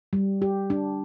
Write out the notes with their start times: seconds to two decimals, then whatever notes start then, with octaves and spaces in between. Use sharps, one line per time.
0.13 G3
0.42 G4
0.70 D4